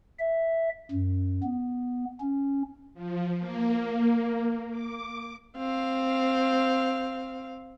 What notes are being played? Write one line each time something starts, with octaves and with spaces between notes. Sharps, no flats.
E5
F#2
B3
C#4
F3
A#3
D6
C4 F5